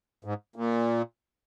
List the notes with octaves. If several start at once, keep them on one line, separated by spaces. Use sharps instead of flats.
G#2
A#2